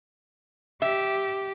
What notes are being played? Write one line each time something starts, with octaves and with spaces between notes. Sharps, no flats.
G4 E5